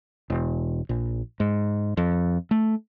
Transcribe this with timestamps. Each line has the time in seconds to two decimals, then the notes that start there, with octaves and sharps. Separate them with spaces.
0.30 E1
0.89 A#1
1.40 G#2
1.97 F2
2.51 A3